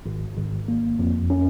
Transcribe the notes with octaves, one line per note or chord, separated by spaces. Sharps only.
G#1
G#1
A#3
F2
C#4